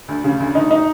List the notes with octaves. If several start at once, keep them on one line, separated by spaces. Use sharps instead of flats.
D2
C#3
D2
D2 D#4
D#4